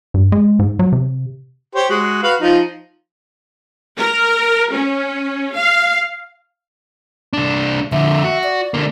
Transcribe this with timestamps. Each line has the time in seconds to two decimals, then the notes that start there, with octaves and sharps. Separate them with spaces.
0.14 G2
0.32 G#3
0.59 G#2
0.79 F#3
0.92 C3
1.75 G4 C5 C#5
1.90 G#3 F#4
2.23 F#4 B4 F5
2.41 F3 D#4 F4
3.99 A#4
4.74 C#4
5.56 F5
7.33 C2 D4
7.92 F2 D3 E5
8.24 F#4
8.44 D5
8.74 D3 A#3